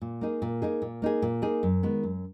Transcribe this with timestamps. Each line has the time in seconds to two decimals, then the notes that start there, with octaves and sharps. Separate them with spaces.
0.02 A#2
0.21 A#3 D#4 G#4
0.42 A#2
0.62 A#3 D#4 G#4
0.82 A#2
1.02 A#3 D#4 G#4
1.22 A#2
1.42 A#3 D#4 G#4
1.63 F#2
1.83 D#3 G#3 B3
2.03 F#2